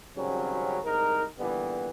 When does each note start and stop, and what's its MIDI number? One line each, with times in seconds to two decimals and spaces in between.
0.17 0.79 32
0.17 0.79 49
0.17 0.79 54
0.17 0.79 55
0.17 0.79 60
0.17 0.79 61
0.85 1.25 36
0.85 1.25 44
0.85 1.25 63
0.85 1.25 70
1.38 1.90 46
1.38 1.90 50
1.38 1.90 52
1.38 1.90 55
1.38 1.90 59